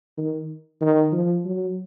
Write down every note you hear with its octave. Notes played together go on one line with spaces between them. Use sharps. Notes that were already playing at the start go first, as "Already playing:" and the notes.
D#3
D#3
F3
F#3